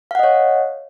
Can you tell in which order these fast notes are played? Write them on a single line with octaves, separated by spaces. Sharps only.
F5 F#5 D#5 C#5